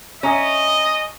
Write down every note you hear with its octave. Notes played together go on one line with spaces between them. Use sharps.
C#4 D#5 E5 G#5 A#5